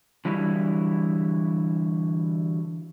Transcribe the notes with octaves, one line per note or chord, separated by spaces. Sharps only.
D3 E3 F#3 G3 E4